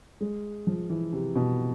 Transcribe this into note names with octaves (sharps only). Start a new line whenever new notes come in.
G#3
F3
E3
C3
B2